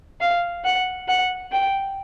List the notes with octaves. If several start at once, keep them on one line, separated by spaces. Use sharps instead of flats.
F5
F#5
F#5
G5